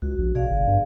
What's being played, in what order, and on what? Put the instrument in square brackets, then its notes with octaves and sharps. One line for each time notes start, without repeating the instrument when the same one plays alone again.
[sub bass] C#2 [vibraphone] F#4
[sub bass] A#1
[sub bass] B2 [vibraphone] G#4 D5 F5
[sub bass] G1
G2